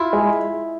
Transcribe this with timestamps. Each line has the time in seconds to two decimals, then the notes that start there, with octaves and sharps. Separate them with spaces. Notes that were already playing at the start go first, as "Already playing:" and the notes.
Already playing: E4 F4
0.13 G#3